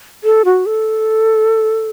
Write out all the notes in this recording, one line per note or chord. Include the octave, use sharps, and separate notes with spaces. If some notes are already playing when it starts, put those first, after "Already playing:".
A4
F#4
A4